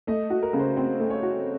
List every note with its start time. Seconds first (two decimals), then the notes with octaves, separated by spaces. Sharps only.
0.07 A3 D#5
0.30 F#4
0.43 A#4
0.53 C#3
0.59 C5
0.77 C4 C5
0.99 A3
1.10 C#5
1.23 F#4